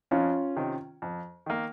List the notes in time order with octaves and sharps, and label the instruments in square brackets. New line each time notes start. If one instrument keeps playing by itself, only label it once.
[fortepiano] F2 [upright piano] C#4 F4
[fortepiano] C3 D#3
F2
D#3 A#3